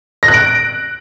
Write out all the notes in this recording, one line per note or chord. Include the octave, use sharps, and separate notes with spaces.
A#6
F#6
D7